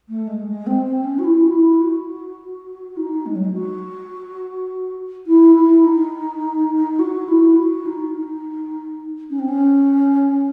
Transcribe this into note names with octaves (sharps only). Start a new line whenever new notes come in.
A3
G#3
G#3
C4
C4
C#4
F#4
E4
F#4
E4
F#4
D#4
G#3
F#3
G#3
F#4
E4
E4
D#4
F#4
E4
F#4
D#4
D#4
C#4
C4
C#4